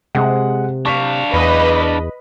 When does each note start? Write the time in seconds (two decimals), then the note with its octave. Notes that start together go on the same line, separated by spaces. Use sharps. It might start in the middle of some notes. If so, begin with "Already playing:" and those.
0.15 C3 G#3 F#5
0.86 D4 F5 C#6 B6
1.33 E2 B4 D#5 B5